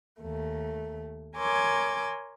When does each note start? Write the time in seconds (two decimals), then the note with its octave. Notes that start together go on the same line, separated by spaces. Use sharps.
0.21 D#2 A3
1.36 A#4 C#5 G#5 C6 D6 E6